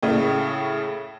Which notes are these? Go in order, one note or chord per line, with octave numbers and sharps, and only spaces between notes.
A2 C#3 A3